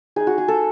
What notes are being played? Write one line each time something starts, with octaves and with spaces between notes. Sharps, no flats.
G#3 D#4 G#4
F#4
G#4
A4